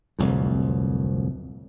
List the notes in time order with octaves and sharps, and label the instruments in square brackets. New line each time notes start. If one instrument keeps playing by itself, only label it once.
[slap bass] D1 C2 F2